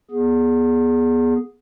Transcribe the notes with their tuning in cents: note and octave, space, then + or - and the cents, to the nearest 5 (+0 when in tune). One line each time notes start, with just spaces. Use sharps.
B3 -20 G#4 +0